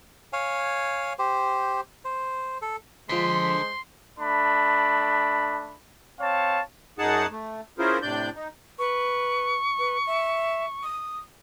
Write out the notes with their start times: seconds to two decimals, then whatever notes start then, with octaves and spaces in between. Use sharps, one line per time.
0.33 C#5 F5 G#5
1.19 G4 C5
2.05 C5
2.62 A4
3.09 D3 F3 G#3 C5 C6 B6
4.19 A3 D4 B5
6.20 C4 C#5 F5 A5
6.99 F#2 D#4 G#4 F#5 A5
7.31 A3
7.79 C#4 E4 F4 G#4 A#4 C5
8.02 A2 C3 D4 D5 G6
8.36 D#4
8.79 B4 C#6
9.79 B4
10.07 E5
10.83 D#6